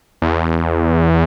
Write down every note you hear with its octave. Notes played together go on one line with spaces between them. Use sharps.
E2